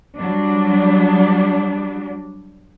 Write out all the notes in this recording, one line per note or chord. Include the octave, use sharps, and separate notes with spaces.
F#3 G3 D4